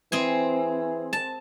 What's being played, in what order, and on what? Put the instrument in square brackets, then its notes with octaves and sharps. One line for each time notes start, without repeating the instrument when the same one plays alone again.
[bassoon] E3 [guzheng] C4 G#4 G#5
[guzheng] A5